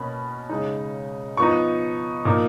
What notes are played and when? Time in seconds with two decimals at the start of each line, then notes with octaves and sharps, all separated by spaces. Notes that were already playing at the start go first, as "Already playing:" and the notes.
Already playing: B2 A#3 C#4 B5
0.49 C#3 G#3 D#4
1.37 F3 B3 D#4 C#6
2.25 A#2 F3 A#3 D#4